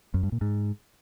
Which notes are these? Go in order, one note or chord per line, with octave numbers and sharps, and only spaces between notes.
F#2
G2
A#2
G#2